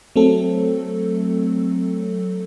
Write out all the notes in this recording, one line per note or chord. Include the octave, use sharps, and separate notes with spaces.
F#3 A3 C4 A4